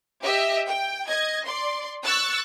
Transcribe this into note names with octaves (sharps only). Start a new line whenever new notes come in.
G4 D#5 E5
G5
D#5 G#6
D5 C6
C#6 E6 F#6 A6